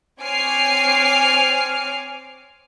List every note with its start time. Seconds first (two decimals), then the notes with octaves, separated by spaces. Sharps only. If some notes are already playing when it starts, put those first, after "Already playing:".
0.21 C4 C#5 G#5 D6 F6 C7